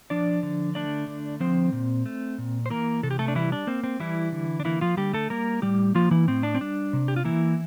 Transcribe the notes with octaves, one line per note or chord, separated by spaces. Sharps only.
F3 D4 D5
D3
A3 D4 D5
D3
F3 C4 C5
A#2
A3
A#2
C5
E3 A#3 A#4
C3 A4
G4
A3 A4
D4
E3 G3 E4
D4
A#3 C4
C4
E3 G3 E4
D3
D4
E3 A#3 E4
F3 F4
D3 G3 G4
A3 A4
G3 A#3 A#4
A2 G3 G4
F3 A#3 F4
E3 E4
A2 C4
D4
C4
G3 D4
C3
G4
F4
E3 A#3 E4